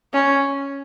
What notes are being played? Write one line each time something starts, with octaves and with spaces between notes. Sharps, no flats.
C#4